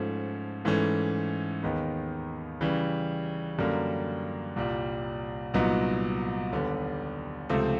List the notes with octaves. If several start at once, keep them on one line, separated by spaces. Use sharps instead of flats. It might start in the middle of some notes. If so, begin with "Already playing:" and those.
Already playing: G#2 F3 A3 C#4
G#2 E3 A3 C#4
D#2 D#3 G#3 B3 D#4
C#3 E3 G3
F#2 D3 G3 A#3
C2 A#2 G3
C2 A#2 F#3 B3 D#4
D#2 D3 G3 B3
C#2 C3 F3 A3 C4